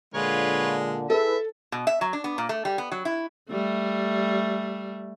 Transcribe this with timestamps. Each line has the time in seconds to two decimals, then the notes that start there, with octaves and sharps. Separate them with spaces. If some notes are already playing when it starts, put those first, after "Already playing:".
0.14 A#2 D3 G#3 F4 B4 C#5
1.10 E4 G#4 A4 B4 E5
1.72 B2
1.87 E5
2.01 F#3
2.13 D4
2.24 B3
2.38 A#2
2.49 A3
2.65 G3
2.78 B3
2.92 F#3
3.05 E4
3.49 G3 A3